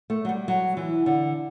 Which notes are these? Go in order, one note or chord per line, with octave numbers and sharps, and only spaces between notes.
A3
F#3
G3
F#3
E3
D3